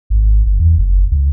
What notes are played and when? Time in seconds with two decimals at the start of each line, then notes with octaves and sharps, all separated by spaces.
0.10 G#1
0.46 G1
0.59 E2
0.78 F#1
1.11 C#2